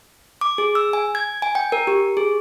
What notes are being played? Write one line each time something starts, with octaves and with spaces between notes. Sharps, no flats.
D6
G#4
E6
G#5
G#6
G#5
G5
A#4
G4
G#4